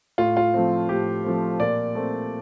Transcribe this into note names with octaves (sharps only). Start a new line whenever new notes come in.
A2 F4
F4
F3 A3 C4
A2 G4
F3 A3 C4
A#2 D5
A3 C4